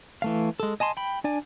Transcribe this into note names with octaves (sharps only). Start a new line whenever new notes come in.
E3 A3 F5
G#3 A4
D#5 G#5 A5 C6
G5 B5
D4 D5 G#5